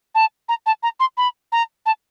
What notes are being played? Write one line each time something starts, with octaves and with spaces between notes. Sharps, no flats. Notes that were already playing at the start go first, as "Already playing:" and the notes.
A5
A#5
A5
A#5
C6
B5
A#5
A5